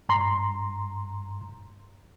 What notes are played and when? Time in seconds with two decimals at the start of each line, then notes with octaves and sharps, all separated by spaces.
0.09 G2 A#5 C6